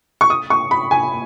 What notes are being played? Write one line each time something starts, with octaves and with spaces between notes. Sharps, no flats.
C#6
D#6
C#6
B5
G#5